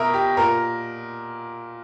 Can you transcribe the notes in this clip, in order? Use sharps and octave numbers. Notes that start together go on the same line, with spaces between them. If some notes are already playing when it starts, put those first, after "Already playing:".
Already playing: B2 A#4 E5
G4
A#2 A#4